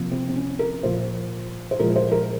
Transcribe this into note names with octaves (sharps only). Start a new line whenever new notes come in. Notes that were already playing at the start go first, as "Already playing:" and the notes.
Already playing: C3 F3 A#3
C4
C4
C#4
A#4
A#2 F3 A#3 C5
C5
A#2 F3 G#3 A#4
C5
A#4